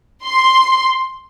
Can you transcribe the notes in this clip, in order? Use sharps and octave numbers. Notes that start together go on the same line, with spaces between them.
C6